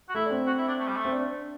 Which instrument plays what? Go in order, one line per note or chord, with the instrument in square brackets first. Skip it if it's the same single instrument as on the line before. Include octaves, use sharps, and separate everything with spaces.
[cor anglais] F#4
[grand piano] A3 [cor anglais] E4
[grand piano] D4
C4
[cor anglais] F#4
E4
D4
A3
G3
A3
[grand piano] C4
D4